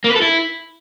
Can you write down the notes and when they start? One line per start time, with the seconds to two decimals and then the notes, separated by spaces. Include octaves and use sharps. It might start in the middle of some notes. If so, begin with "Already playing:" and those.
0.04 A#3
0.10 B4
0.16 A4
0.22 E4